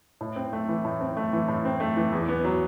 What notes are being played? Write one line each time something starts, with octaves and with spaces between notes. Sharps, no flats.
A2
C4
A3
E3
A2
C4
A3
E3
A2
C4
A3
E3
E2
B3
F#3